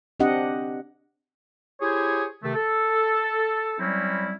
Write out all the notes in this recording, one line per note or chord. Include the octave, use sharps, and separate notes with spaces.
C4 D4 G4 D#5 F#5
E4 G4 G#4 C5 C#5
C3 D#3 A3
A4
F#3 G3 C4 C#4 E4